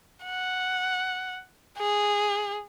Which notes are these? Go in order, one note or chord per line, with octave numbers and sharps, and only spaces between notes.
F#5
G#4